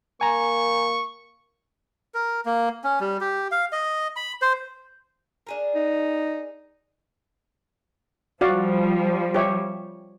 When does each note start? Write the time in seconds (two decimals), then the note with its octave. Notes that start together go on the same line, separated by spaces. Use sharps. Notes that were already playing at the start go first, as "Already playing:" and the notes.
0.21 A#3 G#5 A#5 C#6
2.14 A#4
2.46 A#3
2.84 C#4
3.00 G3
3.21 G4
3.52 F5
3.72 D#5
4.16 B5
4.42 C5
5.47 D4 G#4 A#4
5.75 D#4
8.41 F3 G3 F#4 D5 F5
9.34 G4 C#5 E5